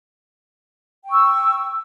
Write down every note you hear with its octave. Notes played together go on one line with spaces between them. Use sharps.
G5 C#6 E6